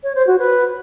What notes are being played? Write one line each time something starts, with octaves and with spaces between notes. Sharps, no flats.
C#5
C5
F#4
B4